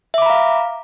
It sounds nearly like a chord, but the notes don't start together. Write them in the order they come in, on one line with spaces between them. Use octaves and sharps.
E5 D6 B5 A#5 F5